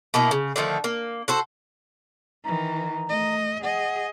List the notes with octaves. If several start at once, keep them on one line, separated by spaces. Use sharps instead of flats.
B2 A#3 D#4 E4
C#3
D3 D#3 F3 A3
A#3
F#4 A4 C5
D#3 E3 A#5
A3 D#5
G#4 D#5 F#5